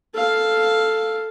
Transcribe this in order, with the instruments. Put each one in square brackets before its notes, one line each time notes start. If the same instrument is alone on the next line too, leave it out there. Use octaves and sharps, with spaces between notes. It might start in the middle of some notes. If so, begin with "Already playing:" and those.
[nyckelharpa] A4 F5